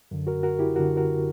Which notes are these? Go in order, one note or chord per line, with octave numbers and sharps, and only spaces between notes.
F#2 D3
F#4 A#4
F#4 A#4
E4 G4
F#2 D3 F#4 A#4
F#4 A#4